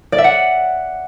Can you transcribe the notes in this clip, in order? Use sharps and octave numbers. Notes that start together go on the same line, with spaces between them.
D5
E5
F#5